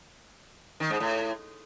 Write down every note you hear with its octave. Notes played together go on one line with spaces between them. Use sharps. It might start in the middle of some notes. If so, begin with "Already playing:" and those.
D#3
G#2
A2